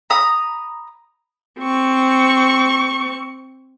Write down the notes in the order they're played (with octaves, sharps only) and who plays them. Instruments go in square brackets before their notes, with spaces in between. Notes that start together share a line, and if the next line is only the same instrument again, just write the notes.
[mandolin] A#5 B5 D#6
[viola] C4 C#6